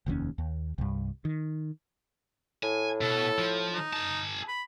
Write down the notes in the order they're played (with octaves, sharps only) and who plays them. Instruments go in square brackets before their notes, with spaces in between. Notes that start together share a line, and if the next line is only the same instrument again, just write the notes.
[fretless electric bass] F1 D#2 G#2 C#4
D#2
C2 G2
D#3
[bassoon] A2 [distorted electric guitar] G#5
[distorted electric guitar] B2 [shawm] A4
[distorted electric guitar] F3
[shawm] D#4
[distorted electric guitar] G#4 A5
[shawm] B5